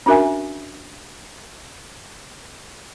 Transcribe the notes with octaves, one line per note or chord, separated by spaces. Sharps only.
C#4 D4 F#4 A#4 E5 G#5